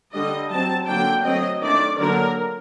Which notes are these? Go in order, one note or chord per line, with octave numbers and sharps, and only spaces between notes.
D3 G3 D4 D#5
F#3 C4 A5
D3 F#3 A#3 D4 G5
F#3 A3 C4 D#5
D#3 A3 D4 D5
D3 F#3 A#3 D4 A#4